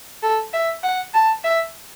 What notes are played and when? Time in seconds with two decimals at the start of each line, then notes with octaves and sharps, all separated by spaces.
0.23 A4
0.53 E5
0.83 F#5
1.15 A5
1.44 E5